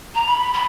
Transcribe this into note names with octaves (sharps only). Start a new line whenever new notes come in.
A#5
B5
B5